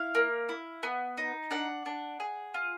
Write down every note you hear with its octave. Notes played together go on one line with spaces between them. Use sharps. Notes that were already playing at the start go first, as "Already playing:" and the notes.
Already playing: E4 F5
A#3
E4
B3
D#4
D4 F#5
D4
G#4
F4